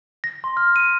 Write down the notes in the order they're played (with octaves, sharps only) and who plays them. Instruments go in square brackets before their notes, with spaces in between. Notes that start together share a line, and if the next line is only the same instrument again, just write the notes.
[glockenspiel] A#6
C6
F6
D#7